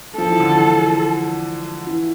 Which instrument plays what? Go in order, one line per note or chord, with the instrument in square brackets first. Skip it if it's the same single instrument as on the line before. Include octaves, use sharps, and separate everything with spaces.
[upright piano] F3 [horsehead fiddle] A4
[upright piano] E3
D3
E3
E3